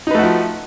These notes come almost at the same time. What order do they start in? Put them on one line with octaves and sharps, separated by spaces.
D#4 B4 A3 F#4 F3